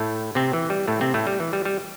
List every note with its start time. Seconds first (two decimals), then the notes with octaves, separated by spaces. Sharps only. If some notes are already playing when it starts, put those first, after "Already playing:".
Already playing: A2 A3
0.35 C3 C4
0.53 E3
0.70 G3
0.88 A2 A3
1.01 C3 C4
1.14 A2 A3
1.27 G3
1.40 E3
1.53 G3
1.65 G3